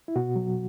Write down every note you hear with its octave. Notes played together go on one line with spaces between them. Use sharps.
E4
B2 F#4
F#3